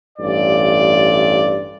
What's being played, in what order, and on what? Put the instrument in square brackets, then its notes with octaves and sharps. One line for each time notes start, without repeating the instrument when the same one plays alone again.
[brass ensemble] A1 G2 D5